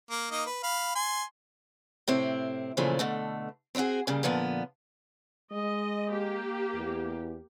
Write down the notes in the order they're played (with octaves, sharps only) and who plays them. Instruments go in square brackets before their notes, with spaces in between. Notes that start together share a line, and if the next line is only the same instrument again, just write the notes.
[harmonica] A#3
A#3 D#4 D#5
B4
F5 B5
G#5 C6
[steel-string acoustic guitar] A2 C3 C4 E4
A#2 C#3 E3 F3 A3 C4
B2 D3 A3
C4 D4 E4 F#4 G#4
A#2 C#3 G3
A#2 D3 F3 B3
[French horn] G#3 [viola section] D#5
[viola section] A#3 G4
[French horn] E2